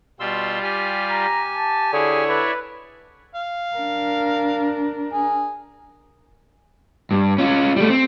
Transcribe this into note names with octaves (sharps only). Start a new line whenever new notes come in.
B2 G3 F4 C6 E6
G4 G#5
A#5
A5
D3 E4 G#4 C#5
B4 D5 E5
F5
D4 A#4
G#4
G2
C#4 F4
G3 A3
C4